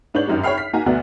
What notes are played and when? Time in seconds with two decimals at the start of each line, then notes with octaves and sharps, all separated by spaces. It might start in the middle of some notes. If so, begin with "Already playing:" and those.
0.14 G#2 D4 B4 C#5 G6 F#7
0.27 G#1 F#2 D#4 G4
0.44 C#5 E5 G5 B5 F6 C7
0.58 B6
0.73 A#3 D#4 F#4 G#5 A#5
0.86 D2 B2 B3 F#4 D5 E5